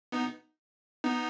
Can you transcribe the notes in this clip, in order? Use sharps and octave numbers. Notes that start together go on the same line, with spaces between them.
B3 D#4
B3 D#4